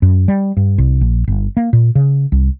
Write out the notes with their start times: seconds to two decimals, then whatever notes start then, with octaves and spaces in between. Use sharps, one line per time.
0.02 F#2
0.28 G3
0.57 G2
0.78 C2
1.01 A#1
1.28 G1
1.57 A#3
1.73 A#2
1.95 C#3
2.32 C2